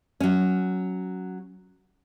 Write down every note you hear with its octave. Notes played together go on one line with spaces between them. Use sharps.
F#3 C#4